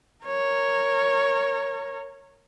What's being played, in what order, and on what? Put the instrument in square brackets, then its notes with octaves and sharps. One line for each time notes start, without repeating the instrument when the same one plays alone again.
[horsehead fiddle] A#4 C#5